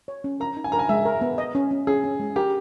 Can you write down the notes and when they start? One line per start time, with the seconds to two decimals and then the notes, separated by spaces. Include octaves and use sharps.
0.08 C#5
0.24 C#4
0.40 A#4 A#5
0.57 D#4
0.64 G#5
0.72 A#4 A#5
0.79 G#5
0.89 G#3 E5
1.05 A#4
1.21 B3
1.38 D#5
1.55 C#4
1.71 C#4
1.87 C#4 G#4
2.04 C#4
2.20 G#3
2.36 G4 A#4